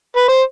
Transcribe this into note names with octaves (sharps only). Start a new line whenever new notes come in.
B4
C5